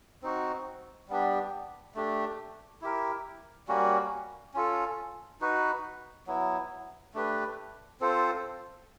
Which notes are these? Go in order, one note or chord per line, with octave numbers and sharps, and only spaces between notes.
C4 D#4 F#4
G3 B3 D4 G4
A3 D4 G4
E4 G4 A#4
G3 A#3 C#4 F#4
C#4 F4 A4
D#4 F#4 B4
F#3 B3 E4
A3 D4 G4 B4
C4 F4 A4 C5